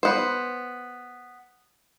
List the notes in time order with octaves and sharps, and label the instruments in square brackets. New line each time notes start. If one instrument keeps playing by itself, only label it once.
[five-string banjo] B3 C5